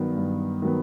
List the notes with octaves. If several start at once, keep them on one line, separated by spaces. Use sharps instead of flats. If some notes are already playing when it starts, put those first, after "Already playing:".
Already playing: G2 D#3 F#3 B3
G2
D#3 F#3 B3